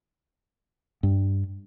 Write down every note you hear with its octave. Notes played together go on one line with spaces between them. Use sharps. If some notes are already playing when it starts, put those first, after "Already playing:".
G2